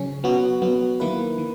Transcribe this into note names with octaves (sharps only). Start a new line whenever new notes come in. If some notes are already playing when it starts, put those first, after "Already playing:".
Already playing: C#3 F#3 C#4
F#3 B3 F#4
F#3 B3 F#4
D#3 A#3 E4 B4
D#3